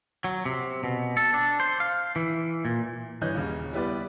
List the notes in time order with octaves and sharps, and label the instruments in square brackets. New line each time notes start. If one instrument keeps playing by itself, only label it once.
[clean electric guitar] F#3
C3
B2
A4
D4
C5
F5
E3
A#2
[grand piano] G2 E3 C#5 D#5 F#6 G6
D#1 C#3
G3 B3 E4 B4 D5